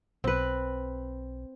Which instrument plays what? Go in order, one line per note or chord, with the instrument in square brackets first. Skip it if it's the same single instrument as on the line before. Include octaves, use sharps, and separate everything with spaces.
[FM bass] B1 [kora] C4 B4